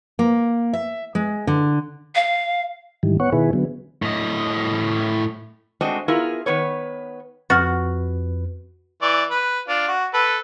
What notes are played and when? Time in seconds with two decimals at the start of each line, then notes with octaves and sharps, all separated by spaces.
0.19 A#3
0.73 E5
1.15 G#3
1.47 D3
2.15 F5
3.03 G#2 D#3 E3 G3
3.20 B3 C#5 F#5 C#6
3.32 B2 D#3 E4 G#4 B4
3.53 D3 F#3 B3
4.02 A2 D#5
5.81 G#3 A3 C4 D4 F#4 D#5
6.08 B3 E4 F4 G#4 A#4
6.46 D#3 B3 B4 C#5
7.50 F2 F#4 B4 C#6 F6 A6
9.02 E3 D5 C#6
9.31 B4
9.68 D4 F4
9.88 F#4
10.14 A4 B4